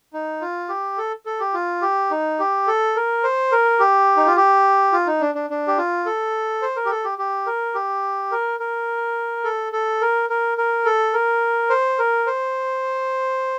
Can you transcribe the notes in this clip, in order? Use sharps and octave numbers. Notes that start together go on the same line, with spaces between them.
D#4
F4
G4
A4
A4
G4
F4
G4
D#4
G4
A4
A#4
C5
A#4
G4
D#4
F4
G4
F4
D#4
D4
D4
D4
G4
F4
A4
C5
A#4
G4
A4
G4
G4
A#4
G4
A#4
A#4
A4
A4
A#4
A#4
A#4
A4
A#4
C5
A#4
C5